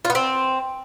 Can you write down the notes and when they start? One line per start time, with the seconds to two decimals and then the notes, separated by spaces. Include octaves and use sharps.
0.05 F4
0.10 B3
0.15 C4